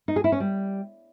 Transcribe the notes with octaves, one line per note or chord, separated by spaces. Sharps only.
D#4
G#4
E4
C#4
G3